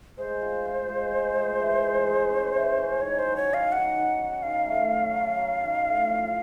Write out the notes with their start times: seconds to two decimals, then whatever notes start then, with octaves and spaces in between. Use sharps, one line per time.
0.18 G#3 C5
0.41 F4
0.65 F4
0.89 G#3
1.12 G#3
1.36 G#3
1.59 E3
1.83 G#3
2.07 G#3
2.30 C#4
2.54 E3
2.78 C#4
3.00 D#3 C#5
3.19 C5
3.25 F#3
3.36 C#5
3.48 D#3
3.54 F5
3.72 D#3 F#5
3.96 D#3
4.18 F#3
4.43 D#3 F5
4.66 A3
4.91 F#3
5.14 F#3
5.37 F#3
5.61 D#3
5.84 A2
6.08 F3